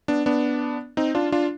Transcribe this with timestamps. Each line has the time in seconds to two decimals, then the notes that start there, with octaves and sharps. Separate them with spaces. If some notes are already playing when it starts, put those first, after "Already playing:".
0.08 B3 D4
0.26 B3 D4
0.97 C4 D#4
1.15 D4 F4
1.32 D4 F4